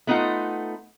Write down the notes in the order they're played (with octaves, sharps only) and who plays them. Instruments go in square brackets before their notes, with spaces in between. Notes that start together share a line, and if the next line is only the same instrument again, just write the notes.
[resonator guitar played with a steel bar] A3 B3 D#4 F4 F#5